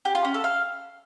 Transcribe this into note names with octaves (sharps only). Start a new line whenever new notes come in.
G4
F4
C#4
A4
F5